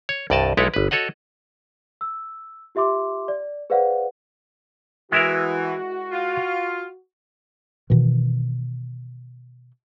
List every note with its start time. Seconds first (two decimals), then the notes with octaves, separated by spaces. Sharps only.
0.09 C#5
0.30 C2 G2 D5 D#5 A5
0.57 B1 G#3 E4 A4 B4 C#5
0.74 G1 B4
0.91 F#4 A4 C#5 D#5 F#5
2.01 E6
2.75 F4 G4 E5 C6 D6
3.28 D5
3.70 G#4 B4 C5 D5 F5 F#5
5.12 E3 G#3 E4 F#4 A#4
6.12 F4
7.90 B2 D#3 E3